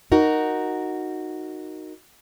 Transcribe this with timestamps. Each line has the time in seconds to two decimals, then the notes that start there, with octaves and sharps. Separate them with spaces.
0.12 D#4 F#4 A#4